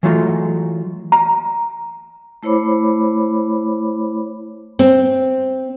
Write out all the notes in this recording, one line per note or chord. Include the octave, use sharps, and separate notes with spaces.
E3 F#3 G#3 A3 F4
A#5
A3 E4 C5 C#5 B5 D6
C4